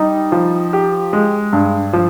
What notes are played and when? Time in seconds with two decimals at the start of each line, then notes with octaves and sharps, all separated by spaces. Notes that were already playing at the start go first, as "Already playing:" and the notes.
Already playing: G3 D#4
0.32 F3
0.73 G4
1.13 G#3
1.53 G2
1.93 F3